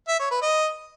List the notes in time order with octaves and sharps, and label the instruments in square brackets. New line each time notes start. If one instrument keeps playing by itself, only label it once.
[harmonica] E5
C#5
B4
D#5